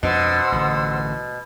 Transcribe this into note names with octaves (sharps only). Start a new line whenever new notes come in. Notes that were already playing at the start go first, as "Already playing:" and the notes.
F2 B2 D4 C5 F#5 E6
A1 D3